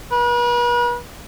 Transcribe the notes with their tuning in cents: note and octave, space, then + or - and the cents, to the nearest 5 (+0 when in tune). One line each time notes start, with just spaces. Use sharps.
B4 -40